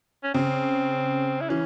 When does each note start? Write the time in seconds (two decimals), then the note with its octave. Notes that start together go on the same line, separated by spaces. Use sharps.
0.24 C#4
0.34 C#3 C4
1.41 E4
1.50 E3 C#4